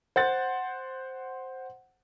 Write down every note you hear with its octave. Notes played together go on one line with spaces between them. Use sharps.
C5 F#5 A6